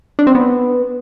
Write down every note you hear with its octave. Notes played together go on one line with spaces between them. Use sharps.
D4
C4
B3